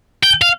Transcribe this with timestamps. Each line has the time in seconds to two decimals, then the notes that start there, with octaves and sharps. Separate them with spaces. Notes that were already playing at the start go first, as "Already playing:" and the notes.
0.23 G5
0.42 F5